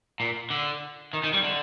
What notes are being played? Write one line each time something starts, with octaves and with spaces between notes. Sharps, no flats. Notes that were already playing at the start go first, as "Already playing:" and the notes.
A#2
D3
D#3
D#3
G3
D3